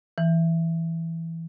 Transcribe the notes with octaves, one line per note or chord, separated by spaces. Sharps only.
E3